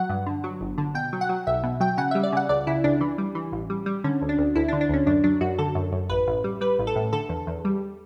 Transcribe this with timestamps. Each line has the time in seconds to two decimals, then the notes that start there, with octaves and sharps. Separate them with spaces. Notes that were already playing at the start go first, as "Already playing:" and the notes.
Already playing: F#3 F#5
0.09 G2
0.26 D3
0.44 F#3
0.61 G1
0.78 D3
0.95 B2 G5
1.13 F#3
1.21 F#5
1.29 F#3
1.47 B1 E5
1.63 B2
1.80 F#3 G5
1.98 C#3 F#5
2.11 G3 E5
2.23 D5
2.33 C#3 F#5
2.49 C#2 D5
2.67 C#3 E4
2.84 C#2 D4
3.01 E3
3.18 G3
3.35 E3
3.52 A1
3.70 G3
3.86 G3
4.04 D3 C#4
4.22 D2
4.29 D4
4.38 D2
4.55 D2 E4
4.68 D4
4.73 D3
4.81 D4
4.89 D2 C#4
5.06 F#2 D4
5.24 F#3 D4
5.41 F#2 F#4
5.58 D3 A4
5.75 F#2
5.92 F#2
6.09 A1 B4
6.27 A1
6.44 G3
6.61 G3 B4
6.79 A1
6.87 A4
6.96 A2
7.13 D3 A4
7.29 E2
7.47 E2
7.65 G3